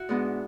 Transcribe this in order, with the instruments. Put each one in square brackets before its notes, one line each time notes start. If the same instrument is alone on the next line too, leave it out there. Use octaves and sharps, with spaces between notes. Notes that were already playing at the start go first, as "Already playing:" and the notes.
Already playing: [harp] E4 F#4
G#2 G#3 B3 D4